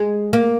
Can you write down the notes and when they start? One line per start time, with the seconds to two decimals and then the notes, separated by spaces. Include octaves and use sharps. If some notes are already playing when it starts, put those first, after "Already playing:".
Already playing: G#3
0.33 A#3